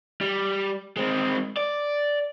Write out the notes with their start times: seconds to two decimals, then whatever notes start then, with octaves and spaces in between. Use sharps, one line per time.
0.21 G3
0.97 G#3 C4
1.57 D5